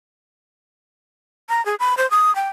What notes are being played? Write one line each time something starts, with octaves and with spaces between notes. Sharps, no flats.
A#5
G#4
B5
C5
D#6
G5